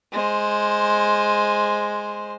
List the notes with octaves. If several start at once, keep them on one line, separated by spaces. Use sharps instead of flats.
G#3 C5